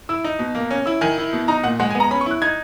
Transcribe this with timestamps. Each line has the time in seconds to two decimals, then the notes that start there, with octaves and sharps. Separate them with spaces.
0.09 E4 E6
0.24 D#4
0.39 B2
0.55 A#3
0.71 C#4
0.86 E4 E6
1.01 D#3 G#5
1.18 E4
1.33 B2
1.48 D#4 A#5
1.64 A#2 F#5
1.80 G#3 F#5
1.90 G#5
1.95 B3
2.00 A#5
2.11 C#4 B5
2.21 C#6
2.26 E4 F#6
2.42 D#4 G#6